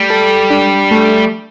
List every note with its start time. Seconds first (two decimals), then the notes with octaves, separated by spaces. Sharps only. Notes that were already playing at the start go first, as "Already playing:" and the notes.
Already playing: G3 A3
0.10 A4
0.50 D4
0.91 A3